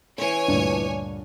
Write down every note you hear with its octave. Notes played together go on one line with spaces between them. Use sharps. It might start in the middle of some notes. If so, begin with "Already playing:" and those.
E3 C#4 C#5 G#5
D2 G2 A#2 D4